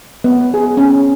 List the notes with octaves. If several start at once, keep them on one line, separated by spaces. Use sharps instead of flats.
B3
G#4
C#4